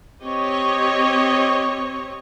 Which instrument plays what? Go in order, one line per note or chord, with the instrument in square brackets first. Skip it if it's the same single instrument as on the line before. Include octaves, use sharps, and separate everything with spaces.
[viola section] C4 G4 C#5 D#5